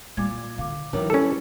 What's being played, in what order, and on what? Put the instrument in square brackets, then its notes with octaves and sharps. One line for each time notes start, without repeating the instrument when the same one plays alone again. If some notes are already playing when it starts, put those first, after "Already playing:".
[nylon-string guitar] A#2 [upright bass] G3 [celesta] D6 G#6
[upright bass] D3 [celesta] F5 D6
[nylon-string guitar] D#3 E3 F#3 [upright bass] D4 [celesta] A#4 C#5 D6
[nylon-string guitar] G3 B4 [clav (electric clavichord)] C#4 A4 [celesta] E4